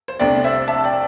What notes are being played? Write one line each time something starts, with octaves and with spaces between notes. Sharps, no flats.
C5
C2 C3 A3 D4 D5 G5
C5 E5
E5 A5
D5 G5